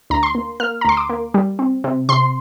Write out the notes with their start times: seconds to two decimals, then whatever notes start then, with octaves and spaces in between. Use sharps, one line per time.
0.10 D2 A#5
0.23 C6
0.35 A#3
0.60 A#3 F6
0.81 A#5
0.85 D2 C6
0.97 D6
1.10 A#3
1.34 G3
1.59 C4
1.84 C3
2.09 C3 C6